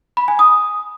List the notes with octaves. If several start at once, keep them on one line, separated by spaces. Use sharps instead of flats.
B5
G#5
D#6